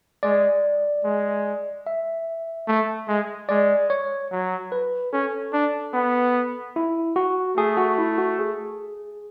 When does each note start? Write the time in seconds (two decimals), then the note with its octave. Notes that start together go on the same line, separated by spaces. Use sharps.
0.23 G#3 D5
1.04 G#3
1.87 E5
2.68 A3
3.08 G#3
3.49 G#3 D5
3.90 C#5
4.31 F#3
4.72 B4
5.13 C#4 A4
5.53 D4
5.94 B3
6.76 E4
7.16 F#4
7.57 A3 G#4
7.77 F#4
7.98 E4
8.18 F#4
8.39 G#4